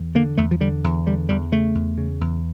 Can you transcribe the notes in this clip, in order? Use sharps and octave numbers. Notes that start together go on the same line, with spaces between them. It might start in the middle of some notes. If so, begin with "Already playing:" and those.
Already playing: E2
D3 A#3
E2 A3
F3
D3 G3
E2
D3 G3
E2 G3
C#3 A3
E2
C#3
E2